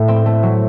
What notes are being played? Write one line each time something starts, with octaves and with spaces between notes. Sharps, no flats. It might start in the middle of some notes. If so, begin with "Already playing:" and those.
Already playing: A2 A3
C4
A3
F#3